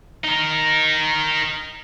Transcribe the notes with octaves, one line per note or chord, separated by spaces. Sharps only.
D#4 A#4